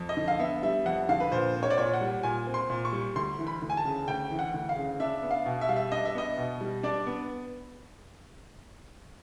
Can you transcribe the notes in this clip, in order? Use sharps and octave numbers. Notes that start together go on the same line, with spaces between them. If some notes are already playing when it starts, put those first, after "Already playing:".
Already playing: F2
D#5
D3
F5
B3 E5
G3 E5
F2 F#5
D3 F5
B4
A#2 C5
C4
C#5
D5
A#2 C#5
F#5
G3
A#2 G#5
C4
C6
A#2
C#6
G3
D2 C6
E3
B5
D2
G#5
A5
C#3
D2 G5
E3
F#5
D2
F5
C#3
D4 E5
B3
F5
B2
E5
G3 F5
E5
D4 D#5
E5
B3 D#5
B2
G3
D4 D5
B3